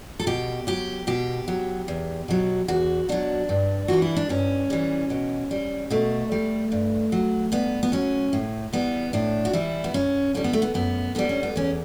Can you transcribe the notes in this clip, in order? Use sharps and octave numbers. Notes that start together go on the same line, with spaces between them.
A4
B2 G4
F#3 G4
B2 G4
F#3
E2
B2 F#3
E2 F#4
B2 F#3 D4
G2
E3 G3 F#4
E4
D4
G2 C#4
E3 G3
B2
G3
B2 A3
G3
G2
F#3
G2 B3
B3
F#3 C#4
A2
E3 G3 B3
A2 D4
F#4
E3 G3 E4
B3
F#2 C#4
D3 G3 C#4
B3
A3
B3
F#2 B3
D3 G3 B3
C#4
B3
E2 C#4